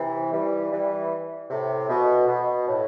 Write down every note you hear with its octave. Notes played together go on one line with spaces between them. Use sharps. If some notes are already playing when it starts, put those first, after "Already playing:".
Already playing: C3 E3
E3 G3
E3 G3
A2 C3
B2
B2
A2